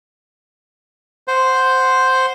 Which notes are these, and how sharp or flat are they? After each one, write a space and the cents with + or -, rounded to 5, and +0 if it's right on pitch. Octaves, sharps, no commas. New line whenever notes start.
C5 +0 F#5 +0